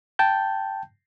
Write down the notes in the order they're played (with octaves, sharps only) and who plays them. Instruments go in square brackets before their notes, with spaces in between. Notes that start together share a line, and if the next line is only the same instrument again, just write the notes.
[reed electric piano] G5 A5 G6